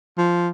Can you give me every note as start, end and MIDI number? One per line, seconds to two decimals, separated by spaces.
0.18 0.50 53